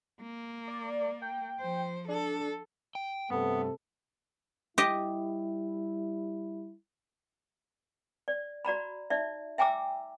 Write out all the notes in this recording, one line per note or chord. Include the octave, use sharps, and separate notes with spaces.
A#3
D5
G5
F3 C5
D4 A4
G5
G2 C3 A3 B3 A4
G3 E4 G4 D#5
D5
F#4 D5 A#5 B5
D#4 D5 E5
E5 G5 G#5 A#5 D6 E6